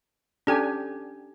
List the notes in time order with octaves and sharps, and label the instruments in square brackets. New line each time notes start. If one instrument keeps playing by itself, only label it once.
[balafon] C#4 A4 [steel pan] D4 G4 G#5